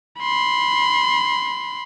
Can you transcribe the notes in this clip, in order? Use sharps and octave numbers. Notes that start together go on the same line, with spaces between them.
B5 C6